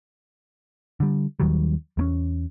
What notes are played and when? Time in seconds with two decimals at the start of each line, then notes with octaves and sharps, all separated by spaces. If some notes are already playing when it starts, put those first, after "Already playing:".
1.00 D3 G3
1.40 D#2 D#3 F#3 G3
1.97 E2 A#3 C#4